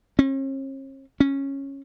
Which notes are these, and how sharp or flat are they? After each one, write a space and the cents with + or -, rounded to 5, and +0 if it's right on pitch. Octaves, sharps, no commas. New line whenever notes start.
C#4 -45
C#4 -10